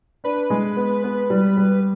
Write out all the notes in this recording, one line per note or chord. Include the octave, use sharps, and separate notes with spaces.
D4 B4
G#3
B3
B3
G3
G3